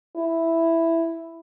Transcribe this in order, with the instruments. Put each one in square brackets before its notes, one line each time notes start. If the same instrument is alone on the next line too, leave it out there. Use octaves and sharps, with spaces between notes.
[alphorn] E4